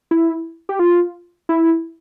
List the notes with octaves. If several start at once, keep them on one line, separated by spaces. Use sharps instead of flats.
E4
G4
F4
E4